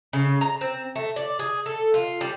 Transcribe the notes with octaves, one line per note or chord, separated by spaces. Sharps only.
C#3
A#5
C4
A3
D5
G#4
A4
F4
G3